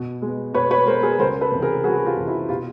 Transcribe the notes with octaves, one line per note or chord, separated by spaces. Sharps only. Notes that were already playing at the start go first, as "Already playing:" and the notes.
Already playing: B2
G#3 B3
B2 B4 C#5
B4 C#5
G#3 B3 A#4 C5
G#4 A#4
C#2 A#4 C5
A4 B4
C3 E3
G#4 A#4
C#2 F#4 G#4
F4 G4
C3 E3
E4 F#4
B2 F4 G4